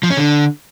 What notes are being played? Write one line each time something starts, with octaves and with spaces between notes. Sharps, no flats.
F3
C#4
D3